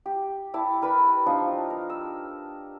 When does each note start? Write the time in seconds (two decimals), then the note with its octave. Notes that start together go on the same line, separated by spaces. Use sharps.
0.06 G4
0.54 E4 D5 A5
0.82 A#4 B4 D5 B5
1.26 F3 D4 D#4
1.70 A#4
1.90 E6